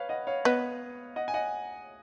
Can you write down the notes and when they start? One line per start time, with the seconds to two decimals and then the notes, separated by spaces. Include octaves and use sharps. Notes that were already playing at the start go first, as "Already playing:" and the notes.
Already playing: B4 C#5 F5
0.09 D#5 F#5
0.27 C#5 F5
0.45 B3 D#5 F#5
1.16 D#5 F#5
1.28 G#5
1.34 D#5 F#5